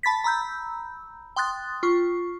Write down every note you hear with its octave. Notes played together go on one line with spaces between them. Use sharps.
A5 B5 A6 B6
A#5 B5 E6 G6
G5 C6 D#6 F#6 A6
F4 C#6